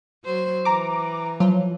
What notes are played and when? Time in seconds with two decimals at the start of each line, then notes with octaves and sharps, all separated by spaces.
0.25 F#3 C5
0.65 E3 A#5 D6
1.40 F3 F#3